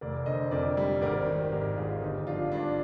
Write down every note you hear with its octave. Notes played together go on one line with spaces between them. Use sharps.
F1 A#4 D5
D3 C5 D#5
F2 A#4 D5
G3
G#1 A#4 D5
D#3 G4 A#4
G#2 G4 A#4
G#1 F4 G#4
G1 D#4 G4
F3 D4 F4
G2 D4